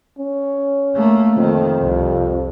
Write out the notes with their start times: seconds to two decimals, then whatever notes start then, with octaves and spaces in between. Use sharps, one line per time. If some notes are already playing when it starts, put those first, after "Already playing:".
0.18 C#4
0.95 A3 A#3
1.37 F2 D#3
1.80 C2